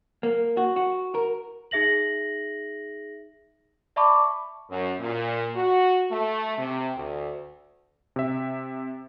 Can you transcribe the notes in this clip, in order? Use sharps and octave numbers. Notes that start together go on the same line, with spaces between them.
A#3
F#4
F#4
A#4
D#4 G#4 E5 A#6 F#7
D5 E5 A5 B5 C#6 D6
F#2
A#2
F#4
A3
C3
D2
C3 E5